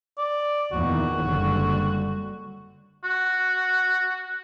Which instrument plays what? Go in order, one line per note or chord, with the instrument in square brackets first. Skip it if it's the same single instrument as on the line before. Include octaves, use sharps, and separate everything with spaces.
[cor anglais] D5
[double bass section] E2 A#2 D#3 [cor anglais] F#4
[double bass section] F#1 D3 G3
[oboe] F#4